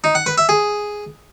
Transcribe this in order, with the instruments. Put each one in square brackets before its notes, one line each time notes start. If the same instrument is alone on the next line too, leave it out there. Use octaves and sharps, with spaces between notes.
[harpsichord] D#4
F#5
B4
E5
G#4